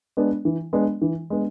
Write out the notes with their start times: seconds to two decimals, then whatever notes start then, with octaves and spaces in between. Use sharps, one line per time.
0.17 G#3 B3 D4
0.45 E3
0.73 G#3 B3 D4
1.02 E3
1.30 G#3 B3 D4